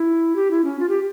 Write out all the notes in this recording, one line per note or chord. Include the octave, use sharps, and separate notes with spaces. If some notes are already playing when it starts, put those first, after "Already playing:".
Already playing: E4
G4
E4
C#4
F4
G4